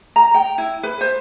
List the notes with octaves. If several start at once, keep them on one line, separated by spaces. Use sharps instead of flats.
A#5
G5
E4
B4
C5